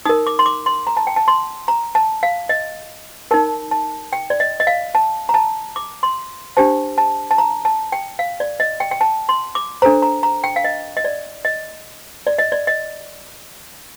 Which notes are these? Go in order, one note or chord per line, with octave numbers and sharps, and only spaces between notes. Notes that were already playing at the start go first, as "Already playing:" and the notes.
D#4 A#4 D#6
D6
C6
D6
C6
A#5
A5
G5
A5
C6
A#5
A5
F5
D#5
D#4 A#4 A5
A5
G5
D5
D#5
D#5
F5
A5
A#5
A5
D6
C6
D4 G4 C5 A5
A5
A5
A#5
A5
G5
F5
D5
D#5
G5
G5
A5
C6
D6
D4 A4 C5 A#5
A#5
A#5
G5
F5
D#5
D#5
D5
D#5
D5
D#5
D5
D#5